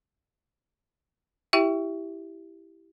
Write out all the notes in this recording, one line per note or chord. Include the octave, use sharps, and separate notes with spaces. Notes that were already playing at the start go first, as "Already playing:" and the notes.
E4 G4 E5 G5